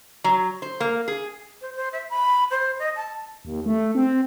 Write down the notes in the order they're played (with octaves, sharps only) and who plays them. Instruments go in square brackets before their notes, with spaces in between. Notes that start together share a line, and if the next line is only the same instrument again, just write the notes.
[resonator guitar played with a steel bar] F#3
C5
A#3
G#4
[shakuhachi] C5
C5
E5
B5
C5
D#5
A5
[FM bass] D#2
A3
C4